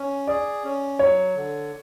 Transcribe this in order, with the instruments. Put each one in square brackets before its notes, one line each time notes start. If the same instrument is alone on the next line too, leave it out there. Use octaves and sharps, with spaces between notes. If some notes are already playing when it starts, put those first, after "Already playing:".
Already playing: [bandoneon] C#4
[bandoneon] G#4 [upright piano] D5
[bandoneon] C#4
[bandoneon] F#3 [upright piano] C#5
[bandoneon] D3